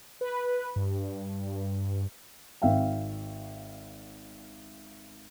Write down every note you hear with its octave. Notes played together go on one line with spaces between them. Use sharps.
B4
G2
G#1 E5 F5 G5